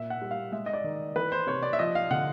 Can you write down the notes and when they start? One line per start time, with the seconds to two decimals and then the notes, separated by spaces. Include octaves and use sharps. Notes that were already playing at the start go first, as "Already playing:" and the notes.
Already playing: A#2 E5
0.10 F#5
0.21 G3
0.31 F5
0.52 G#3 E5
0.66 D#5
0.73 D5
0.84 D#3
1.16 E3 B4
1.32 C5
1.47 C3 C#5
1.63 D5
1.73 E5
1.79 F3 D#5
1.95 F5
2.11 D3 F#5